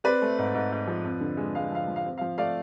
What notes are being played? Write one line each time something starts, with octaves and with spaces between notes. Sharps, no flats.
C4 B4 D5
A3
G#2
G#2
G#2
F3
F2
D3
G#3
G#3 F5
F3 F5
F3
F5
C4
F3 F5
A3 D5 F5